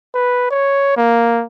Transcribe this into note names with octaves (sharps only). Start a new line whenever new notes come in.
B4
C#5
A#3